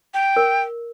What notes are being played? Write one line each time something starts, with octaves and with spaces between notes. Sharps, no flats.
G5
A#4